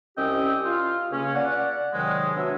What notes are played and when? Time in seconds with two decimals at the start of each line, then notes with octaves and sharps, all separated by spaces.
0.17 C2 C#4 G4 D#5 G5 E6
0.65 F4
1.11 C#2 C#3 A#3 C#4
1.35 D5 F#5
1.93 G#2 C3 D#3 F#3 G#3
2.36 B3 D4 F#4 C#5 E5